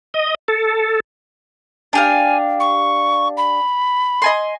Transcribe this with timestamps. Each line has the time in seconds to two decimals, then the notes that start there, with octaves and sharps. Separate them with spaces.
0.14 D#5
0.48 A4
1.93 D4 G4 F5 G#5
2.60 C#6
3.37 B5
4.22 D#5 G#5 C6